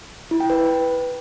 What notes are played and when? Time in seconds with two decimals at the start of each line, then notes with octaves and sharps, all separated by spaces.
0.31 E4
0.40 G5
0.50 B4